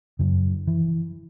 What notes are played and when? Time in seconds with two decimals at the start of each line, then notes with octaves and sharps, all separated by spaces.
0.19 F#2 C#3
0.67 E3